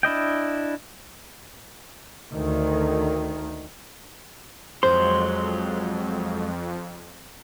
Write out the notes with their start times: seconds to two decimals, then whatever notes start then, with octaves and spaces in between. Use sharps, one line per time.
0.03 D4 E4 D#5 G5
2.32 D2 D#3
4.83 F2 F#3 G#3 C5 C6